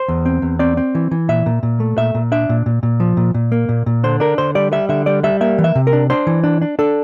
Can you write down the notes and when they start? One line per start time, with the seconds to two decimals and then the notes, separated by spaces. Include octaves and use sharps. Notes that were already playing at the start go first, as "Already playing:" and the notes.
Already playing: C5
0.08 E2
0.26 C4
0.42 E2
0.59 C4 D5
0.77 C4
0.95 E3
1.11 E3
1.29 A#2 E5
1.46 A#2
1.63 A#2
1.80 A3
1.97 A#2 E5
2.15 A#2
2.32 D4 E5
2.49 A#2
2.66 A#2
2.83 A#2
3.00 F3
3.17 A#2
3.34 A#2
3.52 A#3
3.69 A#2
3.86 A#2
4.04 D3 C5
4.20 D4 A#4
4.38 D3 C5
4.55 G3 D5
4.72 G3 E5
4.89 D3 E5
5.06 G3 D5
5.23 G3 E5
5.41 A#3 E5
5.58 E3
5.64 E5
5.75 C3
5.87 A#4
5.93 D4
6.10 D4 C5
6.27 E3
6.44 D4
6.62 D4
6.79 D4 A4